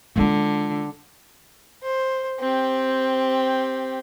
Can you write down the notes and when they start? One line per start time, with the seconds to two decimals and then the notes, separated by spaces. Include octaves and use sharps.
0.16 D3 G#3 F4
1.82 C5
2.40 C4 G4